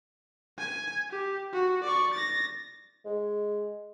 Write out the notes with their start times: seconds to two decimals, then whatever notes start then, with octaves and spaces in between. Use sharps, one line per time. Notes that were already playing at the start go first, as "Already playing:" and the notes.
0.58 G#5
1.10 G4
1.53 F#4
1.84 D5 C#6
2.14 A6 A#6
3.05 G#3